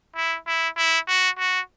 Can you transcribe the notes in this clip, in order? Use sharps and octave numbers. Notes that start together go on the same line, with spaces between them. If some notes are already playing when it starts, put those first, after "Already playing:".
E4
E4
E4
F#4
F#4